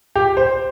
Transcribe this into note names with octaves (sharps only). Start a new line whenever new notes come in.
G4
C5